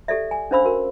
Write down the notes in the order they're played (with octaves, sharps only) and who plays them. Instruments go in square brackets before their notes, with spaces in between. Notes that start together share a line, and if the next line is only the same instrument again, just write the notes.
[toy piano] G4 A4 D5 E5
G#5
C#4 D4 C5 F5 B5 E6
F#4 A#4